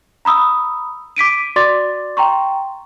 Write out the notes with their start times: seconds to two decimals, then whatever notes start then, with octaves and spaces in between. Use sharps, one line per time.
0.25 A#5 B5 D#6 E6
1.16 D6 B6 D7 D#7
1.56 F#4 D5 C6 D6 A6
2.17 G5 A#5 C6 C#6